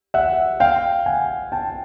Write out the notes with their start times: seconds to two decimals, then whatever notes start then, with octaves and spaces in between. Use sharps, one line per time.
0.14 E5 F#5
0.60 F5 G5
1.06 F#5 G#5
1.52 G5 A5